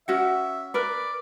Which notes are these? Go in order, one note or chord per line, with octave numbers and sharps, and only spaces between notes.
C#4 F#4 E5 F#5
A#4 B4 D5